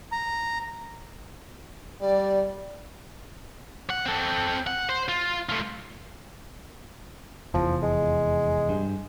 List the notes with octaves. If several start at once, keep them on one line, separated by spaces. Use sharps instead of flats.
A#5
G3 D5
F#5
C4 A4
F#5
C5
F4
A3 F4
F1 E2 F3
G#3
G2